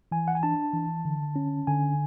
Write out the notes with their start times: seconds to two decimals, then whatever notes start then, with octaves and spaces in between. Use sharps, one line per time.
0.11 E3 G#5
0.28 F#5
0.35 G#5
0.43 D4 A5
0.73 E3
1.05 D3
1.36 C#4
1.67 D3 G#5